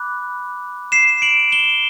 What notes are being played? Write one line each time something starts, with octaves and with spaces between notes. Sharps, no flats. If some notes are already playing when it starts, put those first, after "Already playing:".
Already playing: B5 D6 F#6
C7 E7
D7 F#7
E7 G7